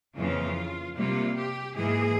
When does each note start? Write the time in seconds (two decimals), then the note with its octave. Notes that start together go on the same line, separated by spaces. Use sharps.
0.17 F2 C#3 E3 A#3 F4
0.97 C3 G3 A#3 F4
1.35 G4
1.75 G#2 E3 A#3 G#4